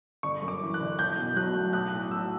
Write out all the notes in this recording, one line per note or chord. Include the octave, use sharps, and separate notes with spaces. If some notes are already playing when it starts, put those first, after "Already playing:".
G1 C#6
F#2
D6
E3
F#6
G1
B1 G6
B2
F#3 F#6
A3
B1 F#6
A2
F#3 E6